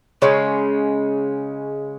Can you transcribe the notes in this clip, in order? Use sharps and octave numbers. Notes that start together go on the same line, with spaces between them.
C#3 G#3 C#4 C#5